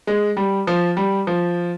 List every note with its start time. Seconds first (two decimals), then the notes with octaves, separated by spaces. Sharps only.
0.07 G#3
0.37 G3
0.67 F3
0.97 G3
1.27 F3